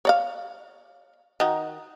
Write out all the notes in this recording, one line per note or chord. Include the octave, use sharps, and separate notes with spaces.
C#5 D5 F5
D#3 D#4 F#4